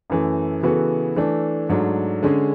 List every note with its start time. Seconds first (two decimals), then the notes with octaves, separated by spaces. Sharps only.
0.10 F#2 E3 A3
0.63 C#3 E3 B3 F#4 A4
1.16 E3 A3 D4
1.69 G#2 F#3 A3 D4
2.23 D3 G#3 C#4 G#4